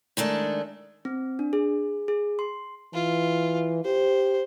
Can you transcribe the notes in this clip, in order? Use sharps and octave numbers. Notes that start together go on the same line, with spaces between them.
D#3 G#3 A3 D4
C4
D4
G#4
G#4
C6
E3 F4
G4 C5